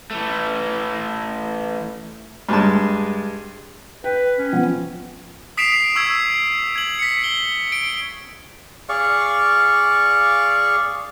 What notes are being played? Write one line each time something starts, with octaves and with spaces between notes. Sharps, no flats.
E3 A3
G2 G#3 A5
B4 G5
C#4
F3 B3 F4
D#6 B6 C7 D7 E7 F7
C#6 E6 G#6
G#6 F#7
B6 C#7
G7
D7
G#4 D5 F5 C#6